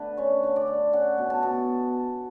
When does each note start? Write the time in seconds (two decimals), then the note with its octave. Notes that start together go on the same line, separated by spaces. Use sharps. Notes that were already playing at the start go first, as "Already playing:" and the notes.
Already playing: D3 A3 B4
0.17 C#4 C#5
0.43 D3
0.56 D5
0.67 D3
0.93 C#4 F#5
1.18 B2
1.30 A5
1.43 B2